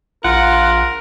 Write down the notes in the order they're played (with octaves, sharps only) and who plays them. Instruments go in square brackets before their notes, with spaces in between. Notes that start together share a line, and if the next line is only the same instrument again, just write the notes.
[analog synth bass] A#1 [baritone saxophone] F4 [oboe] A#4 [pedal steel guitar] F#5